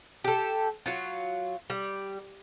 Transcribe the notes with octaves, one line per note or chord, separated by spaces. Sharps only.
G4 A4
F#3 F4
G3